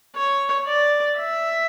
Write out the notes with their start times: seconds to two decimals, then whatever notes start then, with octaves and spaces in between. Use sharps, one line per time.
0.16 C#5
0.67 D5
1.18 E5